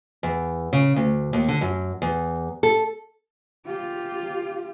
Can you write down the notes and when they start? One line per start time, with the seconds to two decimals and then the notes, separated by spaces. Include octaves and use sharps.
0.23 E2
0.73 C#3
0.96 D2
1.33 D#2
1.48 D3
1.61 F#2
2.02 E2
2.63 A4
3.66 F4 G4